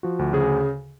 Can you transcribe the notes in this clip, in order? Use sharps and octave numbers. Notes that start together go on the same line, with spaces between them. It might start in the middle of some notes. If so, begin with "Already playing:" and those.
F3 F#4
D2
C#3 G#4